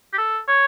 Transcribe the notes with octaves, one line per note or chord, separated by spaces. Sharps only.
G4
A4
C#5